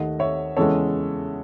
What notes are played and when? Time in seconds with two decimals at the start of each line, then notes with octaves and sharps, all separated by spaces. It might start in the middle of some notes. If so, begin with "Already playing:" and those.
Already playing: D#2 D#3 A3 D#5 F#5
0.19 C#5 E5
0.57 E2 C#3 E3 G#3 A4 C#5